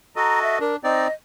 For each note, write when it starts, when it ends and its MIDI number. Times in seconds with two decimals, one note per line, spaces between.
0.16 0.59 66
0.16 0.59 69
0.16 0.59 75
0.16 0.40 82
0.42 0.60 76
0.60 0.76 62
0.60 0.75 70
0.84 1.07 60
0.84 1.07 63
0.84 1.07 74
0.84 1.12 75